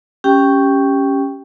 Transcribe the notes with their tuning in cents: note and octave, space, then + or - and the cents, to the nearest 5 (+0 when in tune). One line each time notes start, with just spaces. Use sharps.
C#4 +0 G4 +0 G5 +0